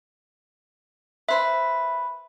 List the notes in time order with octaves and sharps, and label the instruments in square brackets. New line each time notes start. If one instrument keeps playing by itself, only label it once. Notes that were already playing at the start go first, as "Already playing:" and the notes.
[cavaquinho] B4 C5 B5 [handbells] E5